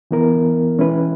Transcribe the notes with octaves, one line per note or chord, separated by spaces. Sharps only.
E3 B3 E4 A#4
E3 G#3 C#4 E4 B4